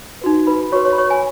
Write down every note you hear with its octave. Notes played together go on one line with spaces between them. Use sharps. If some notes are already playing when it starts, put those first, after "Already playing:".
D#4 F#4 B4
B4 B5
F#4 B4 C#5 C#6
C#5 C#6
B5
C#5 C#6
G#5